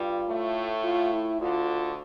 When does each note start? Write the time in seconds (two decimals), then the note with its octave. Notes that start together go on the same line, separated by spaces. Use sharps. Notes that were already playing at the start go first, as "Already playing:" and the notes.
Already playing: G2 G3 F4
0.28 A2 A3
0.84 F4
1.13 E4
1.40 D2 D3 F4